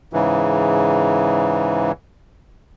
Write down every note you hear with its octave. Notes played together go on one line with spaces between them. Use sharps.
G#2 C#3 E3